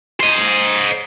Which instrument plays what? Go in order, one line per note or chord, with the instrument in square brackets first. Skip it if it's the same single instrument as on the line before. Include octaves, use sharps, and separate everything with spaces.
[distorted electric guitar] C5 D#5